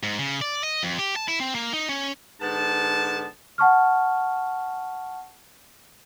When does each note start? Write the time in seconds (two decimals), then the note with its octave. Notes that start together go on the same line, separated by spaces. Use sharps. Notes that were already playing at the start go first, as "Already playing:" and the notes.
0.03 G#2
0.19 C#3
0.41 D5
0.63 D#5
0.83 F2
0.99 G4
1.16 A5
1.28 E4
1.40 C4
1.55 A#3
1.73 D#4
1.89 C#4
2.41 G#2 D3 B3 A5
3.58 F#5 A5 C#6 F6